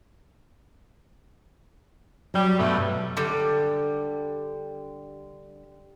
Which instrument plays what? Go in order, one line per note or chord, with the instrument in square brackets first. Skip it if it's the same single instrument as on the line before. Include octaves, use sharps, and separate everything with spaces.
[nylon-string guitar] F#3 [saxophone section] G3
[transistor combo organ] G2 B2 [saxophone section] D3 A3
[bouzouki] D3 G3